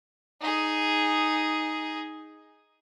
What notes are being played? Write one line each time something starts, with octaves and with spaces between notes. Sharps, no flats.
D#4 G#4